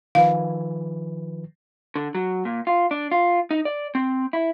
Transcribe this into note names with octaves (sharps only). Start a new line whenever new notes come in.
D#3 F3 B4 F5
D3
F#3
A#2
F4
D4
F4
D#4
D5
C4
E4